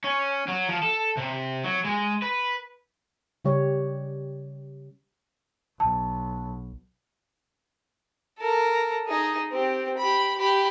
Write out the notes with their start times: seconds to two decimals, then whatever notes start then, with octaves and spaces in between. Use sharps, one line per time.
0.04 C#4
0.48 F#3
0.69 F3
0.83 A4
1.17 C3
1.63 F#3
1.84 G#3
2.22 B4
3.45 C#3 G3 G4 C#5
5.80 B1 A5
8.39 A4 A#4
9.07 D#4 G#4
9.52 C4 G4
9.98 G4 B5
10.38 G4 B5